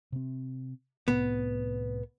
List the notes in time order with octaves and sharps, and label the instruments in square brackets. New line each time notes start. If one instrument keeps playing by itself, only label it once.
[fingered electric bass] C3 C4
[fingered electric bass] C2 A2 C3 [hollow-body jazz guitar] B3